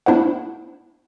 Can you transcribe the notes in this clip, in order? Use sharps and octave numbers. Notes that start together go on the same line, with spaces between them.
B3 D4 E4 C5 F#5